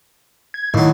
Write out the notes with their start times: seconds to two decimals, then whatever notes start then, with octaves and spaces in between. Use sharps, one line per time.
0.54 G#6
0.74 D#2 A2 F#3